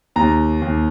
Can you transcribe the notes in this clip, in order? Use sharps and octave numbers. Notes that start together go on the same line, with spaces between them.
D#2 A#5
D#2